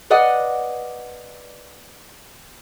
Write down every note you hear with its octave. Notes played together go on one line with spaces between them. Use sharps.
B4 D5 D#5 F#5